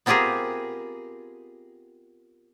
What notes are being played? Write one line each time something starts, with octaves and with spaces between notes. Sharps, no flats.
B3 C4 F4 G4 G#4 A#4